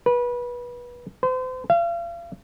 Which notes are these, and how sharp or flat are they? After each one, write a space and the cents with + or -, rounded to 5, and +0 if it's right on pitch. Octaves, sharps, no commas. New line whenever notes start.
B4 -25
C5 -35
F5 -40